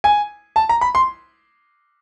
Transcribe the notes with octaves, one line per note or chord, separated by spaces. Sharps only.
G#5
A5
A#5
B5
C6